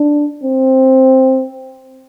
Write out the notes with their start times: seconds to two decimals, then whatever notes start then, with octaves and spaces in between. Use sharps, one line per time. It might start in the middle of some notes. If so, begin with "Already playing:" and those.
Already playing: D4
0.43 C4